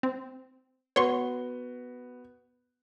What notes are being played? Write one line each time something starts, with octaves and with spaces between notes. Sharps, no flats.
C4
B3 F#4 C#5 C6 C#6 G7